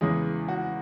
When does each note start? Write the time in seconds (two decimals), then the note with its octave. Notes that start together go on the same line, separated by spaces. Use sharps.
0.01 E2 C#3 E3 G#3 G#4
0.48 F#4